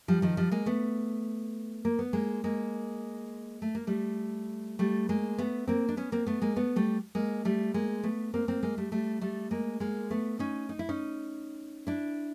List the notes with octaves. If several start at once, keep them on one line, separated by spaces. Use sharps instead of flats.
F3 G3
D#3 F3
F3 G3
G#3 A#3
A3 B3
A#3
B3
G#3 A#3
G#3 A#3
A3
A#3
G3 A3
G3 A3
G#3 A#3
A3 B3
A#3 C4
D4
B3 C#4
A#3 C4
A3 B3
G#3 A#3
A3 B3
G3 A3
G#3 A#3
G3 A3
G#3 A#3
A3 B3
A#3 C4
A#3 C4
G#3 A#3
G3 A3
G3 A3
G3 A3
G#3 A#3
G#3 A#3
A3 B3
C#4 D#4
D#4
E4
C#4 D#4
D4 E4